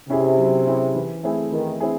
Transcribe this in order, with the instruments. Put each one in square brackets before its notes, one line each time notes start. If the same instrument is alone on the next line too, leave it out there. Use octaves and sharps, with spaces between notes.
[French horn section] C3 [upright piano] C#4 E4 G#4
[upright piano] F#3
C#4 E4 G#4
E3
A3 C4 E4 G#4
[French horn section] D#3 [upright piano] E3
[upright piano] C4 E4 G#4